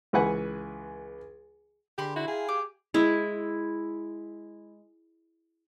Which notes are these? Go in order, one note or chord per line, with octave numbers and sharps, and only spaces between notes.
C#2 E3 B4 F#5 G#5
D3 G4 G#4 A#4 B5 C6
E4 F#4
G#4 F5 G5 G#5
G4 D6
G#3 E4